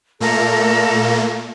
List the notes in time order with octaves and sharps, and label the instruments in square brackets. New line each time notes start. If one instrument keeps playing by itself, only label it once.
[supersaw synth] A#2 A3 A#3 [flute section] A4 A#4